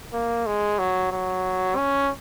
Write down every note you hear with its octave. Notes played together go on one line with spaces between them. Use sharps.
A#3
G#3
F#3
F#3
C#4